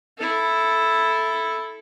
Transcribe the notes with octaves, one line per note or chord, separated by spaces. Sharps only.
E4 A4